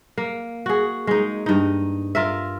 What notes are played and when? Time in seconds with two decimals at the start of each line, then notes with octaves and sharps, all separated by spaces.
0.18 A#3
0.66 F#4 G#4
1.07 G#3 D#4
1.46 G2 D#4
2.15 F4 A#4 E5